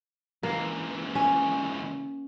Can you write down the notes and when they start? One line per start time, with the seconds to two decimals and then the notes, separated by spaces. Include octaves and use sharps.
0.43 C#2 E3 A#3
1.15 C#4